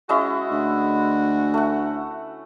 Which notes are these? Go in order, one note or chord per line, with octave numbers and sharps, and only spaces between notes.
G#3 C#4 E4 F#4
D2
A3 F#5